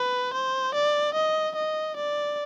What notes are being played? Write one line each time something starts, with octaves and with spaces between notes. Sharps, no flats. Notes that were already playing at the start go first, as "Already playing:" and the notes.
Already playing: B4
C5
D5
D#5
D#5
D5